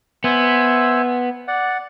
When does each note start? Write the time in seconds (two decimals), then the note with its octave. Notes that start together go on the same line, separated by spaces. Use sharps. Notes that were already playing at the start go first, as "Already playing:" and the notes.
0.24 B3 C5 E5 G#5
1.48 D5 F#5